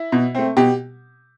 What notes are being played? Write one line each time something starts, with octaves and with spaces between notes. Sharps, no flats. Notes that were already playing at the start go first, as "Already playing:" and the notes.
Already playing: E4
B2
A3 C4
B2 G4